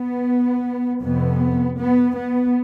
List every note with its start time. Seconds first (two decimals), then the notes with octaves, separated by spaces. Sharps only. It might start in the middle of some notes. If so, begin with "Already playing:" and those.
Already playing: B3
1.02 F2 C3 B3
1.78 B3
2.15 B3